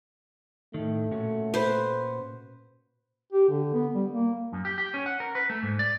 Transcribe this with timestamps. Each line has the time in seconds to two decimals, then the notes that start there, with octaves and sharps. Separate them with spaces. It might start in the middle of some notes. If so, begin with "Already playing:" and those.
0.74 A2 D#3 A3
1.11 A#2 C#4 F#4
1.54 B4 C5
3.33 G4
3.49 D3
3.73 B3
3.94 G3
4.11 A#3
4.52 F#2
4.65 G4
4.78 G4
4.94 C#4
5.06 F#5
5.20 A#4
5.35 B4
5.50 A3
5.63 G#2
5.79 D5